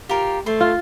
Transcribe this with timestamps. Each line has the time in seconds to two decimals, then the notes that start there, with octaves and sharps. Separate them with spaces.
0.09 F4 G4 A#4
0.46 A3 C5 C6
0.61 F4